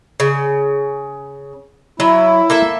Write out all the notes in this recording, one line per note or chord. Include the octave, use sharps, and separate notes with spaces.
C#3
F#3 E4
A#3 A4 E5